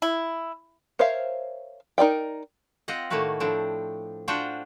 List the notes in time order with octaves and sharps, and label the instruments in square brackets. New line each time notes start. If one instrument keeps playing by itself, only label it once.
[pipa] E4
[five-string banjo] A#4 C5 C#5 E5 F5
D#4 A#4 D5 G5
[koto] C4 F4 D#5 F#5
A2 D#3 A3 A#3 F#4 B4
A2 F3 C4 D4
D4 F4 F#4 C5 F#5 G5